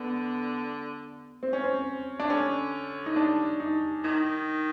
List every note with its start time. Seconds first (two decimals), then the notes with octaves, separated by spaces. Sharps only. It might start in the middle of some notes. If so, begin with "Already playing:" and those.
Already playing: D3 B3
1.43 C4
1.53 C#4
1.64 C4
2.19 D4
2.29 D3 C#4
3.06 D#4
3.16 D4
3.60 D#4
4.04 D#3 D#4